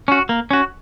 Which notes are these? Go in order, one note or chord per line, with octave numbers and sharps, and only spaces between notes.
C#4 F#4
A#3
C#4 F#4